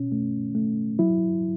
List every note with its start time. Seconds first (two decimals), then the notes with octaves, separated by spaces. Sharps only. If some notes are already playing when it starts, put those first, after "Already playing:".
Already playing: B2 C#4
0.12 A3
0.55 A3
0.99 F#3 E4